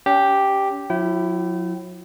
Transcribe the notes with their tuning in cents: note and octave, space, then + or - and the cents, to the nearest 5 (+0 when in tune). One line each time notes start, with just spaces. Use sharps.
C#4 +40 G4 +0
F#3 -40 E4 +10 G5 -30